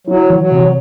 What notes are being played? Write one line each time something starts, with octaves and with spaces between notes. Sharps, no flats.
F#3 E4
E3
F#3
C3